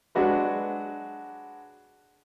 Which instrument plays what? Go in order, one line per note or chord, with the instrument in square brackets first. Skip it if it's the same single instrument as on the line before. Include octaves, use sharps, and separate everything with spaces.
[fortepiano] F#3 G#3 D4 F#4 B4